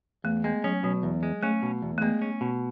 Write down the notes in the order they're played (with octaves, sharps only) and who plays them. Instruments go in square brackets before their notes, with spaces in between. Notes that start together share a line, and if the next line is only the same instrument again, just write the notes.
[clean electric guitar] E2 [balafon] A3
[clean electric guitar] G#3 [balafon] B3
[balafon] F#3 [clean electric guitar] C#4
[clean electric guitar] B2 [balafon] F#3
[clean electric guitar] E2
G#3
[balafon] A3 [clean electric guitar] C#4
[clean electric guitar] B2
E2
[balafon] A3
[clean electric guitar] G#3 [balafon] B3
[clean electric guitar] C#4
B2